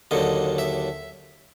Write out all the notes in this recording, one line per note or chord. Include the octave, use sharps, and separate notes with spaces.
D#2 D3 F#3 D#5
E5